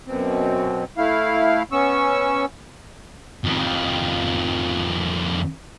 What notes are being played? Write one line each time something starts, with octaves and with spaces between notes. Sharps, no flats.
F#2 B2 C4
A3 E4 F5
B3 C#4 C#6 E6
F2 D#3